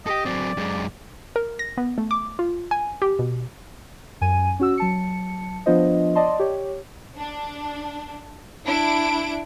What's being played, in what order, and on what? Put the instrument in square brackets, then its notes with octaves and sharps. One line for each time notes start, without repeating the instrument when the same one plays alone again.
[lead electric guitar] G4 A4 [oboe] D#5
[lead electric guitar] F#3 C4 [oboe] D5
[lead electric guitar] F#2 G#3
[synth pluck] A#4
A#6
B3
A3
D6
F4
G#5
G4
B2
[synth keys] F#2 G#5 D#7
C#4 F#4 E6
F#3 A5 C#7
F3 B3 D4 F4 C5 D#5
D5 D#5 A5 C6
G4 C#5
[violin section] D4
D4 E4 D7